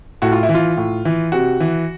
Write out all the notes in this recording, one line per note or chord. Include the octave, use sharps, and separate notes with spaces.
A2 F#4
F4
E4
E3
F4
A2
E3
C3 F#4
E3